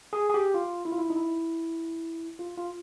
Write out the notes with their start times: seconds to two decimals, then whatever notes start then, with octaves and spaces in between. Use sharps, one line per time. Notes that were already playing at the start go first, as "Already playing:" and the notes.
0.13 G#4
0.30 G#4
0.34 G4
0.54 F4
0.85 E4
0.92 F4
0.98 E4
1.10 D#4
1.16 E4
2.39 F4
2.57 F4